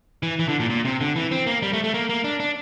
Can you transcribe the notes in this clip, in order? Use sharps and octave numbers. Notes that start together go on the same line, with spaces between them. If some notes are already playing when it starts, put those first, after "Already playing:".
E3
E3
D3
A#2
A#2
C3
D3
E3
C4
A#3
G3
A3
A3
A#3
A#3
D4
D4